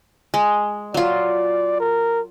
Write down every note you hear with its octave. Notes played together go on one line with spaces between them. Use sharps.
G#3
F#3 F4 D5
A#4